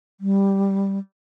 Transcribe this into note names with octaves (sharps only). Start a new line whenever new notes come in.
G3